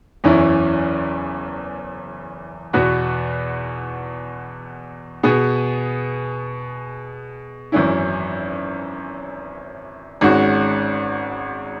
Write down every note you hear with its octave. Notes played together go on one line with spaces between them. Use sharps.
F#1 E2 E3 C#4 E4
E2 B2 B3 F#4 B4
B2 B3 G#4
G#1 F#2 E3 C#4 E4
G#1 G#2 G#3 C#4 F#4